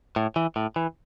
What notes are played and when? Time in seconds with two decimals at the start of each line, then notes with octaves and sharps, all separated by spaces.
0.16 A2
0.36 E3
0.56 A2
0.76 E3